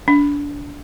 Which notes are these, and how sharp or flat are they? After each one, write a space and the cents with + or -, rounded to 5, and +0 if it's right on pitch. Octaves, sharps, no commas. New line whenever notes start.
D4 -25